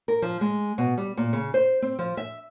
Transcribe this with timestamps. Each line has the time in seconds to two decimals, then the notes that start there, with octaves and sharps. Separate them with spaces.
0.08 A#4
0.22 F3
0.41 G#3
0.78 B2
0.97 G3
1.17 A#2
1.33 C#3
1.54 C5
1.82 C4
1.99 F3
2.17 E5